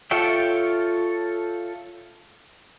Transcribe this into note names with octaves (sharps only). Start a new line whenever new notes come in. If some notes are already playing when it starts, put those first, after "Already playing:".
F4 A4 C#5 E5 G5